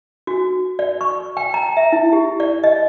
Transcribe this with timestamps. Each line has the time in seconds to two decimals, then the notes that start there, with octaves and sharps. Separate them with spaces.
0.27 F#4
0.79 D5
1.01 C#6
1.37 G5
1.54 A#5
1.77 E5
1.93 E4
2.13 G4
2.40 D5
2.64 D#5